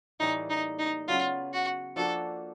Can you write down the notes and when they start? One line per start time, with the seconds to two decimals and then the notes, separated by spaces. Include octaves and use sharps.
0.20 A2 E3 G3 A#3 D#4
0.50 D#4
0.79 D#4
1.08 C#3 F#3 B3 F4
1.53 F#4
1.96 F3 A#3 D4 F#4 A4